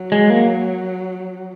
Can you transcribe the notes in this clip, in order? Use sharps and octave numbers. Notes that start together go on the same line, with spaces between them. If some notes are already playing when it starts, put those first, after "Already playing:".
Already playing: F#3
G#3
A#3